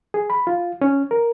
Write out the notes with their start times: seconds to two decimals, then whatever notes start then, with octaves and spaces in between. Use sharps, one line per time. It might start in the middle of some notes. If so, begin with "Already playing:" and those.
0.14 G#4
0.30 B5
0.47 F4
0.81 C#4
1.11 A#4